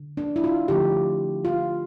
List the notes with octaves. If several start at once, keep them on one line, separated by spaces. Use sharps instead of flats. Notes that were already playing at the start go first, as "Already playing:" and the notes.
Already playing: D3
D4
E4
F4
D3 F3 A3 G4
F4